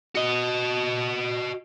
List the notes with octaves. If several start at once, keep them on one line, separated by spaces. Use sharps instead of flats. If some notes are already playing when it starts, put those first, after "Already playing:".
F#4 D#5